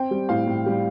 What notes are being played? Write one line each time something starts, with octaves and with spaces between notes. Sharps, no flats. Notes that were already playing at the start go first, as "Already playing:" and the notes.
Already playing: C4 G5
G3
A2 F5
A2
G3